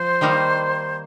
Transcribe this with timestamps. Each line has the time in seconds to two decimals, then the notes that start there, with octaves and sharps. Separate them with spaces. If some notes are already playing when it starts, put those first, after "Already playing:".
Already playing: F3 C5
0.21 D#3 G3 A#3 D#4